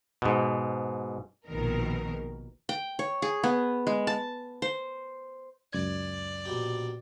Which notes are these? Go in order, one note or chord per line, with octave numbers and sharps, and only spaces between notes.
G#2 B2
A#1 B2 D#3 A#4
G5
C#5
G#4
B3
G#3
A5
C5
C#2 F#2 D5 G#6
A#1 B2 G4